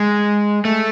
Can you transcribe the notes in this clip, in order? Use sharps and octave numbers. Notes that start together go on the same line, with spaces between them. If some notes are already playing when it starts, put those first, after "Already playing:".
Already playing: G#3
A3